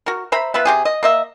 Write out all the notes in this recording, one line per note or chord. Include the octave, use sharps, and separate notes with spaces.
F#4 A#4
C5 E5 A#5 B5
F3 B3 B4 E5
C3 G4 G#4
D#5
A#3 D#5 E5